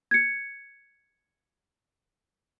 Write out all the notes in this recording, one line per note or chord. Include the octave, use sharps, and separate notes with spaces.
G#6 C#7